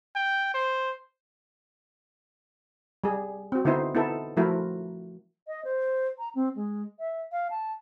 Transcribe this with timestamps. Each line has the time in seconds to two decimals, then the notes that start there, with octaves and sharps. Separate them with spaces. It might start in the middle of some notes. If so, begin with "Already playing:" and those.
0.16 G5
0.54 C5
3.04 G3 G#4
3.52 C4 F#4
3.65 D3 B3 D#4 E4 C5
3.95 B3 D#4 E4 A4
4.37 F3 A3 E4 F#4 A#4
5.47 D#5
5.65 C5
6.19 A#5
6.35 C4
6.56 G#3
6.99 E5
7.32 F5
7.50 A5